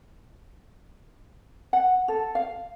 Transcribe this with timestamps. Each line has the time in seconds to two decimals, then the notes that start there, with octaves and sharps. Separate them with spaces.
1.73 F#5
2.08 A4
2.35 F5